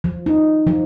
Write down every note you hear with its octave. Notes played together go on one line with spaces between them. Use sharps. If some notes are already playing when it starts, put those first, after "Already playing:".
F3
D#4
F3